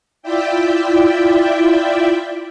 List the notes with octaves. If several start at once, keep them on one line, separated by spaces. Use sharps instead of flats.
E4 F4 D5 E5 G5